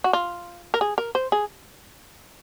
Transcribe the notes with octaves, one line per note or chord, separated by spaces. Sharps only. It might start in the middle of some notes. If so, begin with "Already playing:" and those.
F#4
F4
A#4
G#4
A#4
C5
G#4